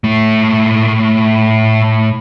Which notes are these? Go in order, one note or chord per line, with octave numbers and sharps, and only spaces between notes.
A2 A3